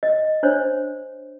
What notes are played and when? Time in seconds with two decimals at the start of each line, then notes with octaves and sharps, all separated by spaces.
0.03 D#5
0.43 D4 C5 C#5